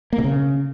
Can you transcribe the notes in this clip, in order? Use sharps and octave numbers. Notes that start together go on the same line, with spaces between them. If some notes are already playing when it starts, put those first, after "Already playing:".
A#3
C3
C#3